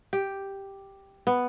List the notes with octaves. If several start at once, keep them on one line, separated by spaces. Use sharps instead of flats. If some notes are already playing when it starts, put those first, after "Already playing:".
G4
B3